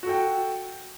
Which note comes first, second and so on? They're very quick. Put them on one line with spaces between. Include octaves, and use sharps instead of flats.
F#4 A4 G5